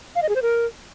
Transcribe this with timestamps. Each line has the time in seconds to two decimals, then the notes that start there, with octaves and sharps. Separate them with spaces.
0.16 F5
0.22 D#5
0.29 G#4
0.36 C5
0.42 A#4